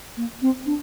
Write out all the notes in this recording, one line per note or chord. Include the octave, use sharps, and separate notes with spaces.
A#3
C4
D4